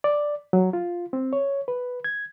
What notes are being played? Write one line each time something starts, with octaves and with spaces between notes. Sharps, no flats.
D5
F#3
F4
C4
C#5
B4
G#6